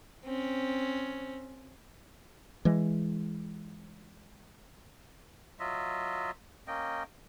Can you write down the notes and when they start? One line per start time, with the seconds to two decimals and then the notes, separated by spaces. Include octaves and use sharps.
0.25 C4 C#4
2.65 E3 G#3
5.60 F#3 F4 D#5 E5
6.67 A#3 C#4 D#5 G5